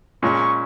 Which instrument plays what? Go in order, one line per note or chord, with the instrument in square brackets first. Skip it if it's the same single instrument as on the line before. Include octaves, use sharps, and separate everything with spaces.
[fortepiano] A#2 G#3 C#4 [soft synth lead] C#6